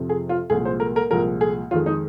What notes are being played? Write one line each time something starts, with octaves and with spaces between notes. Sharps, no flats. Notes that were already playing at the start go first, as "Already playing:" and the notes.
Already playing: F2 C3 F3
G#4
F4
C2 A#2 F3 G#3 G#4
C5
A#4
A#4
C2 A#2 F3 G#3 A#4
G#4
F2 D#3 G#3 F4
D#4